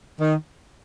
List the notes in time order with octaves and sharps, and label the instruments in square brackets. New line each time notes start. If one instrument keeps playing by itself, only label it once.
[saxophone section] D#3